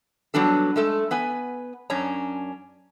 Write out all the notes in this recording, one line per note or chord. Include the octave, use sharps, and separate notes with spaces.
F#3 G3 B3 D4 A4
G#3 A3 A4
B3 B4 G#5
F#2 C#4 D4 C#5 A#5